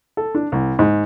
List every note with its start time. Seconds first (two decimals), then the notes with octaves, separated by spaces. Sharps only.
0.17 A4
0.35 D4
0.52 C2
0.79 G#2